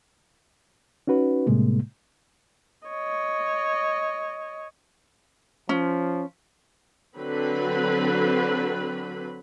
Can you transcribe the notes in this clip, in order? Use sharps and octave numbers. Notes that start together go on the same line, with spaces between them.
C#4 D#4 F#4 B4
A2 C3 G3 G#3 A#3
C#5 D#5
F3 C#4
D3 F#3 C4 B4 B5